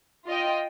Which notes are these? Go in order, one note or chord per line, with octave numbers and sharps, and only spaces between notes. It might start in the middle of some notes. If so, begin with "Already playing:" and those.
F4 D#5 G5